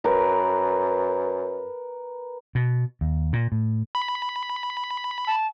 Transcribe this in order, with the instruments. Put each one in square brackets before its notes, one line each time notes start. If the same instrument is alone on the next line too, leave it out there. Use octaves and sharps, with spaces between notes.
[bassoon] F#2 [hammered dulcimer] A#4 B4
[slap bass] B2
D#2
A#2
A2
[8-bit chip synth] B5
[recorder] A5